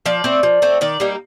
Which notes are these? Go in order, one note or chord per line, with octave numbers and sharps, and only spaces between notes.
F3 D5
A3 C4
F3
A3 C4
D#3 D5
G3 A#3 D#4